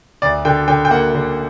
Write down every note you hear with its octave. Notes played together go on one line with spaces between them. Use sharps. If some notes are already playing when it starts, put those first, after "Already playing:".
D2 D5
D3 G5
D3 G5
G5
A#3 F#5
D3